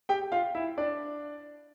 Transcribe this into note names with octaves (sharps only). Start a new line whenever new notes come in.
G4 G5
F4 F5
E4 E5
D4 D5